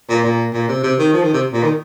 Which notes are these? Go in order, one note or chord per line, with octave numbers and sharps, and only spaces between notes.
A#2
A#2
A#2
C3
C3
D#3
F3
D#3
C3
A#2
D#3